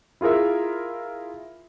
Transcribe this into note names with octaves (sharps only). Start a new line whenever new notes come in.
E4 F4 G#4 A#4 E5